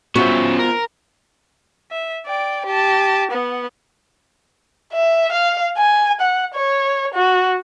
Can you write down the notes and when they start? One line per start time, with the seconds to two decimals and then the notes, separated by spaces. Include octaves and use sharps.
0.16 B3 C#4 F4 F#4 C5 E5
0.59 A#4
1.91 E5
2.26 D5 G5
2.66 G4 A5
3.31 B3 F#5
4.93 E5
5.32 F5
5.78 G#5
6.21 F#5
6.55 C#5
7.15 F#4